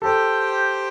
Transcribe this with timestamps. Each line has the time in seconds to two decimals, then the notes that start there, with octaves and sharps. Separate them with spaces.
0.02 G4 A4 C5 G5